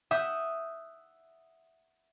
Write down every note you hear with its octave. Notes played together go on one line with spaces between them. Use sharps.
E5 F#5 D#6 G6